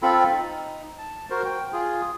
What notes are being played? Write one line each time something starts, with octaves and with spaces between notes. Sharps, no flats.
C4 F4 A4 B5
D#4
A5
F#4 A#4 C5
G5
F4 G#4